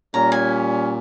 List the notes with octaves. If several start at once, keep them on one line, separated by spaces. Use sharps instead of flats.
A#2 G3 C#4 A#5
G#5